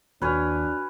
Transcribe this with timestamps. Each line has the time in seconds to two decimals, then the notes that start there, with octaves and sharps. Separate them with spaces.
0.22 D#2 D4 F#4 B4 C#5 G#5 F6